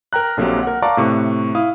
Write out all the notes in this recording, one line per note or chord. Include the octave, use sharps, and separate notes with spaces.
A#4 G5 A#5 F#6
A#1 D3 F#3 A#3 C4 G4
A#4 F#5
D5 F5 A5 A#5 C#6 D6
A2 C3 C#6
E4 F5 D#6